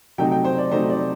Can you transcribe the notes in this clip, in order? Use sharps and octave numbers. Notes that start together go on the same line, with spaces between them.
C3 F#3 A3 D#4 G5
G5
C5
D5
C3 F#3 A3 D#4 C5
D5